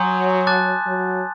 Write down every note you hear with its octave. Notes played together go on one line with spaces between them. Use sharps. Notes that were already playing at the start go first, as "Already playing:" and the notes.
Already playing: F#3 G#5 C6 D#6 G6
A5 D6 F#6 A6
F#3